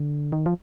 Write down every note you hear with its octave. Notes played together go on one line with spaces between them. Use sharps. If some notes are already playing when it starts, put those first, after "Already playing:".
Already playing: D3
D#3
F3